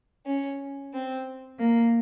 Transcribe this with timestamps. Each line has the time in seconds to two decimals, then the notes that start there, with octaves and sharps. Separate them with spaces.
0.25 C#4
0.93 C4
1.59 A#3